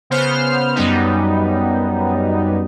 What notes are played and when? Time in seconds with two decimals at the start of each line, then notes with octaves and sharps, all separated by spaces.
0.10 C#3 B3 C5 F6
0.75 F#2 G3 B3 D#4